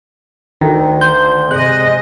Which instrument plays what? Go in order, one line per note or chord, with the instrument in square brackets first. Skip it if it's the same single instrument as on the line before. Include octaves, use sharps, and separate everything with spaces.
[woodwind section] D2 [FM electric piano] D#3 [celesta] G5
[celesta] C6 [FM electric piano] G6
[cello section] C3 D#5 [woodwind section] G#3 [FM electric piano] F#6